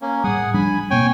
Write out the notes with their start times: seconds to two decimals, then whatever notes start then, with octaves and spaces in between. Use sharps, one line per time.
0.02 A#3 C#4
0.24 A2 G3 G#4 F#5 D#6
0.54 F3 G3 D4 G#5 B5
0.90 B2 A#3 C4 C#5 G5 G#5